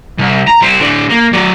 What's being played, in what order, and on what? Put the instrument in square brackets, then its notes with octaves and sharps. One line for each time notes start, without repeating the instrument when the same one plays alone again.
[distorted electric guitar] C2
A#5
G3 C5
A2 D4
A#3
F#3 D5